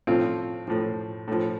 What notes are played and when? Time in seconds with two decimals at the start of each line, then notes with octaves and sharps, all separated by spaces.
0.07 A2 F3 C4 F4
0.67 A2 F3
1.28 A2 F3